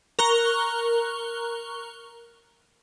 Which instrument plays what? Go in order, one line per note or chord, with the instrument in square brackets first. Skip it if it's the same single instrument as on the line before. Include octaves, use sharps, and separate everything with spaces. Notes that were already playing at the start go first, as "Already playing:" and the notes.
[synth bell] A#4 A#5 C#6 F#6 G7